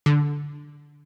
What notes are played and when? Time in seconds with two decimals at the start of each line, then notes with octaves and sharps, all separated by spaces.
0.06 D3